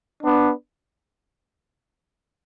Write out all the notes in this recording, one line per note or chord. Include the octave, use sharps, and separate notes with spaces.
B3 D4